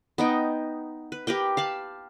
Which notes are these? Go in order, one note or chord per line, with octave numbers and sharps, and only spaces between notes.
B3 D#4 G5
B4
G4 A#4 B4 G5
F5 A5 B5